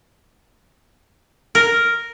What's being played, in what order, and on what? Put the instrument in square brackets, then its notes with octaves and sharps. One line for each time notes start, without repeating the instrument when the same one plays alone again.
[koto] A#4